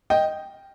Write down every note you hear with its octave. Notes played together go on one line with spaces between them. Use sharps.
D#5 G5